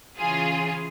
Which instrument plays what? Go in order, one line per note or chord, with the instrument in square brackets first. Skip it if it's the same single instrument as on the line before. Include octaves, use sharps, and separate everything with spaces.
[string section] C#3 E3 F4 G#4